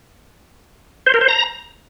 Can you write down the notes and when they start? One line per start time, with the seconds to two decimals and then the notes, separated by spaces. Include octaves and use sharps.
1.06 C5
1.14 A#4
1.21 C5
1.29 A#5